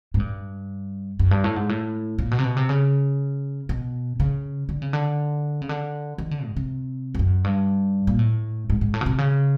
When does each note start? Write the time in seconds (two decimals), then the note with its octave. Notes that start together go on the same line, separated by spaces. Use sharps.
0.14 G#2
0.20 G2
1.19 F#2
1.31 G2
1.44 A2
1.56 G#2
1.69 A2
2.18 A#2
2.31 B2
2.38 C3
2.44 B2
2.57 C3
2.69 C#3
3.69 B2
4.20 C#3
4.69 D3
4.82 C#3
4.93 D3
5.62 C#3
5.69 D3
6.18 D#3
6.31 D3
6.45 G#2
6.57 C3
7.15 F2
7.19 F#2
7.44 G2
8.07 A#2
8.19 A2
8.70 G#2
8.81 G#2
8.94 A2
9.01 B2
9.06 C3
9.18 C#3